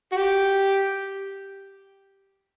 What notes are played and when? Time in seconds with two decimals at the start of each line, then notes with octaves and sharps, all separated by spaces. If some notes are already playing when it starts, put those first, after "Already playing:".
0.12 F#4
0.17 G4